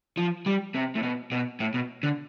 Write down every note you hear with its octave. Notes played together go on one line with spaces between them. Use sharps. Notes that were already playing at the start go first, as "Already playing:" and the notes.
F3
G3
C3
A2
B2
B2
A2
B2
D3